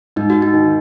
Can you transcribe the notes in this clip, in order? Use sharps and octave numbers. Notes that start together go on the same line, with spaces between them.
G#2 D#4
F#4
D#4
D#3